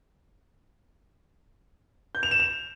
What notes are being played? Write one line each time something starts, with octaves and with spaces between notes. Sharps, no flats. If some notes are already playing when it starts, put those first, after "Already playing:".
G6
F7
E7
F7